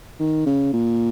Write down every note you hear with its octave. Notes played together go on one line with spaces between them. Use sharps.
D#3
C#3
A#2